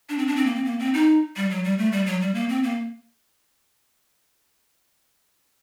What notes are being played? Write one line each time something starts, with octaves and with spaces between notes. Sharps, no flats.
D4
C4
D4
C4
A#3
C4
A#3
C4
D#4
G3
F#3
G3
A3
G3
F#3
G3
A#3
C4
A#3